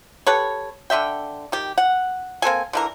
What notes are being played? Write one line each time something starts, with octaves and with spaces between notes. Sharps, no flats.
G4 A4 B4 C#5
D3 D5 E5 G5
D#3 G4
F#5
A#3 C4 A4 G#5
D3 E3 A#4